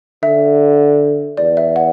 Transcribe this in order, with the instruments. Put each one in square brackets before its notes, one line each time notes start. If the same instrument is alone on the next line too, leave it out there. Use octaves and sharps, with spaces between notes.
[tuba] D3 [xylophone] E5
[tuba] E2 [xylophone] D5
[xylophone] E5
F#5